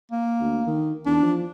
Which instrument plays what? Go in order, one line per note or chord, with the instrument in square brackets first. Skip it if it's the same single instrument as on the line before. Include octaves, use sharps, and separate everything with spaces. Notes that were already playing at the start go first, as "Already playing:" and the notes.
[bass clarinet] A#3
[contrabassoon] D2
D#3
[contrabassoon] E2 [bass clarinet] D4
[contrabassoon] F3